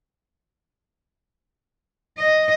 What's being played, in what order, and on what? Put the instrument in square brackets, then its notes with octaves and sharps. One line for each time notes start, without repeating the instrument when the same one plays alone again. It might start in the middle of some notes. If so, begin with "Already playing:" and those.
[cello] D#5